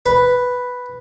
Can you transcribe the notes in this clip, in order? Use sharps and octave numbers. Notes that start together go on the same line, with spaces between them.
B4